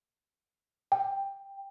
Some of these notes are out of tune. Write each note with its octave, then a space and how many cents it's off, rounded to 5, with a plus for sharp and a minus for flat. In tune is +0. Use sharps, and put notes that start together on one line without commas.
G5 +10